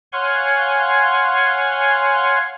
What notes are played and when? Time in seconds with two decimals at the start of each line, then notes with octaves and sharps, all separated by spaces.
0.13 C#5 F5 F#5 G#5 C6 C#6